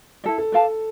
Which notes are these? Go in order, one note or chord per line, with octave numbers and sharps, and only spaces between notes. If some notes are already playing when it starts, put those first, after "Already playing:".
E4 A4 D5
A4
B4 D5 F5 A5